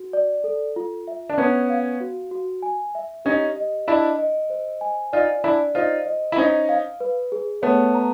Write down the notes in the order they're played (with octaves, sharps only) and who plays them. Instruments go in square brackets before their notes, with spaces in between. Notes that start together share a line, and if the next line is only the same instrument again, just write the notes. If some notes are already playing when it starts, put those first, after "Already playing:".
Already playing: [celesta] F#4
D5
A4
F4
E5
[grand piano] D4
[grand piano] B3 C#4 [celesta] C#5
[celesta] F5
F#4
F#4
G#5
E5
[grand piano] C#4 D#4 [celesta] G4
[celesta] D#5
[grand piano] D4 E4 [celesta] D#5
[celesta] D#5
C5
G#5
[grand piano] D#4 F4 [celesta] D5
[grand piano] D4 E4 [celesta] D5
[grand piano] D#4 F4 [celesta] C5
[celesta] D#5
[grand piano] E4
[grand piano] C#4 D#4 [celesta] C5
[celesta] F5
B4
G#4
[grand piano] A3 B3 [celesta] C#5
[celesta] A#5